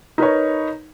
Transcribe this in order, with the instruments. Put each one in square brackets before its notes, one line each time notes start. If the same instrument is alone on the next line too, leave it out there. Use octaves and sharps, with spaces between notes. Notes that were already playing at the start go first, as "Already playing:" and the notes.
[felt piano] D#4 A#4 B4 C#5